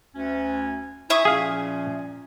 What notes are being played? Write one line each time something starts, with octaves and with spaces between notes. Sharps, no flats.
D2 C#4
E4 E5 G#5 C#6 D#6
A#2 F3 C#4 G#4 F5